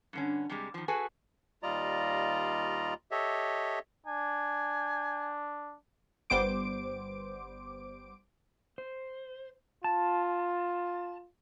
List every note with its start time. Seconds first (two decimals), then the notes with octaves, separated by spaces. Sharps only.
0.13 G2 D3 C#4
0.50 C3 G3 G#3
0.74 D#3 F3
0.88 F#4 G#4 A4 B4 G#5
1.63 D#2 G3 F4 D5 D#5 A#5
3.11 G4 A4 C#5 D#5 E5
4.07 D4 G#5
6.30 G1 G3 B3 C5 D6 D7
8.78 C5
9.84 F4 A5